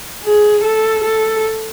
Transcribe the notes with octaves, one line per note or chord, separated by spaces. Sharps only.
G#4
A4
A4